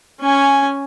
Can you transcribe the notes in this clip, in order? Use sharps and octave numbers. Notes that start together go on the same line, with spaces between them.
C#4 G#5